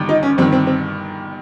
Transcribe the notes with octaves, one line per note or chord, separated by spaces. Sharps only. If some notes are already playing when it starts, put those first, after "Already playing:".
Already playing: G1 G2 D#3
D#4
C#4
G1 G2 D#3 C4
C4
C4